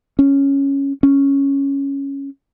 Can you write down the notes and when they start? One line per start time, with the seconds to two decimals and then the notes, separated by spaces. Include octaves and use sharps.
0.19 C#4
1.03 C#4